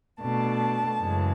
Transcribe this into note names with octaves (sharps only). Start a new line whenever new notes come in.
B2 A3 D4 A5
F#2 C#3 E3 G#3